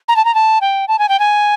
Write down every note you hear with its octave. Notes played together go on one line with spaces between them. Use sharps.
A#5
A5
A#5
A5
G5
A5
G#5
G5
G#5